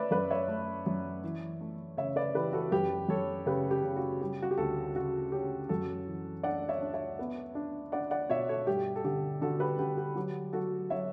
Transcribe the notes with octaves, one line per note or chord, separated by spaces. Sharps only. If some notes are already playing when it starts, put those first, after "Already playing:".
Already playing: A3 B4 C#5 D5 E5
F#2 B4 D5
C#5 E5
A3
F#2
E3
A3
C#3 C#5 E5
B4 D5
E3 G4 B4
F#4 A4
F#2 G4 B4
F#2 A4 C#5
C#3 G4 B4
G4
C#3
F#4
G3 G4
F#4
G4
D2 F#4 A4
C#3 F#4
C#4 G4
F#2 F#4 A4
E3
D4 D5 F#5
C#5 E5
D4
C#5 E5
B3
D4
D4 D5 F#5
D5 F#5
B2 C#5 E5
A4 C#5
G2 G4
A4
D3 G4
D3 F#4 A4
G4 B4
D3 G4
G4
F#3 G4
F#3 F#4 A4
F#3 C#5 E5